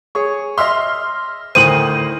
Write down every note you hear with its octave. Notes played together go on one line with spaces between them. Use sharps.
G#4 C#5 C#6
D#5 E5 C6 F6
D2 A2 D#3 C5 D#6 D#7 F#7